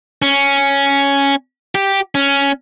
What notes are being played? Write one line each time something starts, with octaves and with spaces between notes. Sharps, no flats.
C#4
G4
C#4